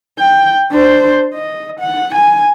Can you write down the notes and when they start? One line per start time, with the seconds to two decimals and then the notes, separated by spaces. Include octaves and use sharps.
0.20 G5
0.71 D4 C5
1.34 D#5
1.80 F#5
2.15 G#5